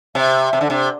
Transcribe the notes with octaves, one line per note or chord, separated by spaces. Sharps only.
C3 E5
C3
D3
C3